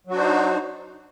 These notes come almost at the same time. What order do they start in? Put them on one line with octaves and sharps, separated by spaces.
F#3 F#4 D4 C5 D#4